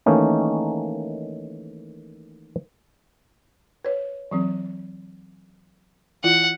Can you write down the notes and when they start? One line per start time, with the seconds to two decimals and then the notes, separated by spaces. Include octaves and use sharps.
0.06 D#3 E3 A3 A#3 C#4 D#4
3.85 B4 C#5
4.31 E3 F#3 C4
6.24 E3 E4 F4 F#5